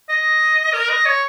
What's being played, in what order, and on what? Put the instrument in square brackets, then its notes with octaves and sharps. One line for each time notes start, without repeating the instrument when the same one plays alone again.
[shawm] D#5
A#4
D#5
C#5